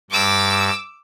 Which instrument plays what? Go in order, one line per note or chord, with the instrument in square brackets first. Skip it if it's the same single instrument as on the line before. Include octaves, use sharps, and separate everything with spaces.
[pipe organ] G2 [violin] D6 E6